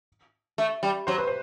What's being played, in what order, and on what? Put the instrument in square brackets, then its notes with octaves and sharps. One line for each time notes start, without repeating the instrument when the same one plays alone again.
[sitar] A3
G3
[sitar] F#3 [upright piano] C5
[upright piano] B4
C5